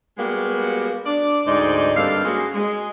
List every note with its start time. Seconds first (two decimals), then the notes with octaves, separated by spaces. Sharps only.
0.18 G3 G#3 A#3 B3 F#4 G4
1.06 D4 D5
1.46 D2 G#2 D#4 C5 D5
1.96 G2 G3 A#3 C4 A4 F5
2.25 G#3 A#3 C#4 F#4
2.54 G#3